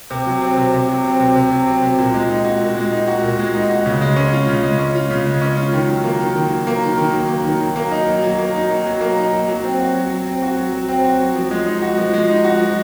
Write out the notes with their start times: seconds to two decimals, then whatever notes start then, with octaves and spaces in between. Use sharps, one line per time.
0.10 C3
0.26 F#3
0.42 C4
0.57 C3
0.73 C3
0.89 F#3
1.04 C4
1.20 C3
1.36 C3
1.51 F#3
1.67 C4
1.82 C3
1.98 A#2
2.14 G#3
2.29 D#4
2.45 F#4
2.61 A#2
2.76 G#3
2.92 D#4
3.07 F#4
3.23 A#2
3.39 G#3
3.54 D#4
3.70 F#4
3.86 C#3
4.01 G#3
4.16 C#4
4.32 F4
4.48 C#3
4.63 G#3
4.79 C#4
4.95 F4
5.10 C#3
5.26 G#3
5.42 C#4
5.57 F4
5.73 D#3
5.89 F#3
6.04 A#3
6.20 D#3
6.36 D#3
6.51 F#3
6.67 A#3
6.83 D#3
6.98 D#3
7.13 F#3
7.29 A#3
7.45 D#3
7.61 F#3
7.76 A#3
7.91 D#4
8.07 F#3
8.23 F#3
8.38 A#3
8.54 D#4
8.70 F#3
8.86 F#3
9.01 A#3
9.17 D#4
9.32 F#3
9.48 F#3
9.64 C4
9.79 F#4
9.94 F#3
10.10 F#3
10.26 C4
10.42 F#4
10.57 F#3
10.72 F#3
10.89 C4
11.04 F#4
11.20 F#3
11.36 F3
11.51 G#3
11.66 D#4
11.82 F#4
11.98 F3
12.13 G#3
12.29 D#4
12.44 F#4
12.60 F3